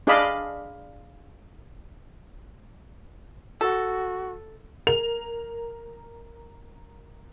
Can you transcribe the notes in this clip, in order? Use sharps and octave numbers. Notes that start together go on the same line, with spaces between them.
D4 G#4 D5 D#5 F5 B5
F#4 A4
A#4 F7